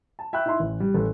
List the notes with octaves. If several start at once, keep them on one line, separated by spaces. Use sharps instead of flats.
A5
E5 F5 G5 B5 C#6 F#6
D#4 E4 E5 B5 C6
A1
G3
A1 A4